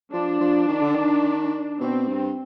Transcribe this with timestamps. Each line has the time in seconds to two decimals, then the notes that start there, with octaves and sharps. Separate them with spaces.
0.13 F3 D4
0.40 F3
0.68 D#3
0.82 D3
0.95 D#3
1.80 B2 C4
2.08 G2